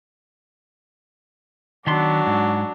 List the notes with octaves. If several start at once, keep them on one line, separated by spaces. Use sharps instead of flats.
D#3 F#3 B3 D4 C6
G#2